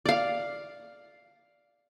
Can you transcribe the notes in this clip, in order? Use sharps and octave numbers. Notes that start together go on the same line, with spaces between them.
D5 F5